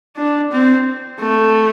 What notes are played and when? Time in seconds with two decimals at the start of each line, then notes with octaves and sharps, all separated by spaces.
0.17 D4
0.51 C4
1.20 A3